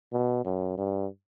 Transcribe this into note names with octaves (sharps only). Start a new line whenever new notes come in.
B2
F#2
G2